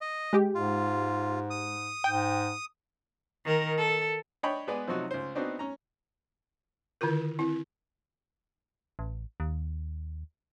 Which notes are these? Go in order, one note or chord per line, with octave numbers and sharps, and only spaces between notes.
D#5
G#3 G4
G#2 F4
D#6
G#2 G5
D#3 A#4
A4
D4 C#5 D#5 G5 B5
G#3 B3 G#4 B4 D5
C3 F3 F#3 D#4 F#4
C#2 C5
B3 C4 D4 D#4 F#4 C5
C#4 A#5
D3 D#3 E4 F4 A#4
C4 E4
A1
D#2